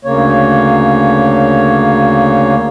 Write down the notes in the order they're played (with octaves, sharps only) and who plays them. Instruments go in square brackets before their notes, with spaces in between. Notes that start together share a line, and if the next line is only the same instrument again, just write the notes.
[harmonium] D2 C#3 A#3 C#5